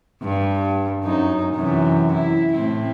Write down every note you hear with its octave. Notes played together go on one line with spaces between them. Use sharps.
G2
F#2 D#4
F#2 C3 E3
E4
A2 C4 E4